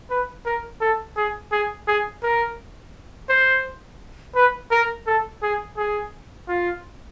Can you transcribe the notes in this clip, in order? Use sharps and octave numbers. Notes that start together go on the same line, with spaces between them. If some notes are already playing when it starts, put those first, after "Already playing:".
B4
A#4
A4
G#4
G#4
G#4
A#4
C5
B4
A#4
A4
G#4
G#4
F4